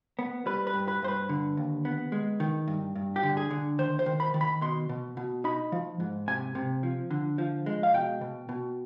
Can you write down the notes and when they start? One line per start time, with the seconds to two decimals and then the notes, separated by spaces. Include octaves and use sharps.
0.19 B3
0.46 G3 B4
0.67 B4
0.73 G2
0.88 B4
1.02 G2 C5
1.08 B4
1.29 D3
1.57 D#2
1.85 B3
2.12 G#3
2.40 D#3
2.68 G2
2.96 G2
3.16 G4
3.23 D3
3.37 G#4
3.51 D3
3.79 D#3 C5
3.99 C5
4.06 D#3
4.20 B5
4.34 D#3
4.41 B5
4.61 B2 C6
4.89 B2
5.17 B2
5.44 D#4 B5
5.72 F3
6.00 G#2
6.28 C3 G#5
6.55 C3
6.83 F3
7.11 D3
7.38 F3
7.66 G#3
7.83 F5
7.94 B2 G5
8.21 B2
8.49 B2